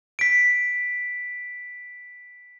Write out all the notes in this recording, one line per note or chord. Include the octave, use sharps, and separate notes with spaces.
B6 D7